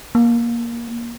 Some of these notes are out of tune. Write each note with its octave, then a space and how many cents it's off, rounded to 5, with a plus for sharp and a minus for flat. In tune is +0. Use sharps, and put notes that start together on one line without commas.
A#3 +15